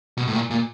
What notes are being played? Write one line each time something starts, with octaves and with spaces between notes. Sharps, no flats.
B2
A2
A#2
A#2